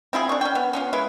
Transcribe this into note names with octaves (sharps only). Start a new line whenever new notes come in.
C4 E4 F4 G#4
D4 C#6
C#4 G5
B3
B3 C#4 F4
G#3 E4 B4